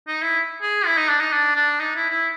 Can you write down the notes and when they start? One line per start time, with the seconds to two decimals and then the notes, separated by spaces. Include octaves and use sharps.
0.08 D#4
0.23 E4
0.62 G#4
0.86 E4
0.98 D#4
1.09 D4
1.21 D#4
1.33 D4
1.56 D4
1.80 D#4
1.96 E4
2.10 E4